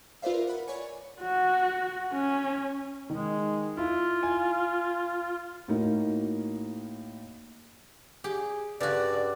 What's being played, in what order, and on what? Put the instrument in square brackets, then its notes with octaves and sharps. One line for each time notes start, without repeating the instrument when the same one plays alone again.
[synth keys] F4 B4 C5 D5 E5 F5
A#4
F#5 B5
C#5 D5 G#5 C#6
[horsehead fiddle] F#4
C#4
[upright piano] D#3 [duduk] G#3
[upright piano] E4 [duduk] F4
[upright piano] G#5
[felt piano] A2 A#3 D#4 F#4
[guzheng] G4 [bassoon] G#4
[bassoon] G2 [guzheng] C#3 F#4 [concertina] D5